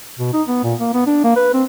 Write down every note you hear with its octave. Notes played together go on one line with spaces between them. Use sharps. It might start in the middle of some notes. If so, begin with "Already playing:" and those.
B2
D#4
B3
A#2
A#3
B3
D4
A#3
B4
C4